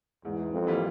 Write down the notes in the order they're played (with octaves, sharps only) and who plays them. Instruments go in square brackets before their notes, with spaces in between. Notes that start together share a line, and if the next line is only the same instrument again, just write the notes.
[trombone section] E2 [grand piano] G#2
[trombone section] F2
[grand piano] E3 G3 A#3 F4